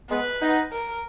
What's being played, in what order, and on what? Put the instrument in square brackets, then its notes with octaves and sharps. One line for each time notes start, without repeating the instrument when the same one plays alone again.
[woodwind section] G#3 B3 [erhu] B4
[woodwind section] B3 D#4
[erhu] A#4